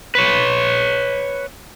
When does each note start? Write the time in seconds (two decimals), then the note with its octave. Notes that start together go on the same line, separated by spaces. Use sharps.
0.15 B4 C#5